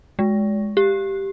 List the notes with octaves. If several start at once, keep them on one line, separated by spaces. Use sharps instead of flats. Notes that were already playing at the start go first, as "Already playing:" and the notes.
G#3
G4